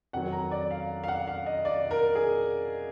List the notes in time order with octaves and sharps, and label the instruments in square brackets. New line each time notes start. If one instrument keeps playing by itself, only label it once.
[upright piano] F2 D#3 F#3 F#5
A#5
D5
F5
F5
F#5
F5
D#5
D5
A#4
G#4